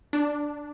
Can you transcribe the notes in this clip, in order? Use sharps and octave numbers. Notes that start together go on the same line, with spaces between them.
D4